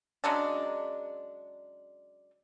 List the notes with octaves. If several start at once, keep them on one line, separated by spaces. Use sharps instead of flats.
C#3 F#3 G#3 D4